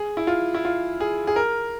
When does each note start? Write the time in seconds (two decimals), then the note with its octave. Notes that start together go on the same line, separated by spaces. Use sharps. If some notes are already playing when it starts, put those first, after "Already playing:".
Already playing: G#4
0.17 E4
0.27 F4
0.54 E4
0.65 F4
1.00 G#4
1.27 G#4
1.36 A#4